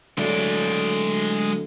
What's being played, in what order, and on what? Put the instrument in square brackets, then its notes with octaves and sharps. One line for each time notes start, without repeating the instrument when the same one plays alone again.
[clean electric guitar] D3 F#3 A3 [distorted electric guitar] G#3 D5